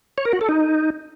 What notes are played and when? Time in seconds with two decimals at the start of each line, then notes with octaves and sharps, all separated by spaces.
0.18 C#5
0.25 A#4
0.33 F#4
0.41 A4
0.49 D#4